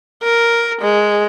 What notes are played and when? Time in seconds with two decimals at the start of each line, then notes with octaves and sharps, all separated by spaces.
0.23 A#4
0.82 G#3